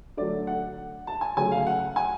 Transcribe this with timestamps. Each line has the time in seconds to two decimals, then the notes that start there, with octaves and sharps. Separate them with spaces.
0.17 D3 F#3 A3 D5
0.47 F#5
1.07 A5
1.21 G#5
1.37 C#3 F#3 A3 G#5
1.52 F5
1.67 F#5
1.96 G#5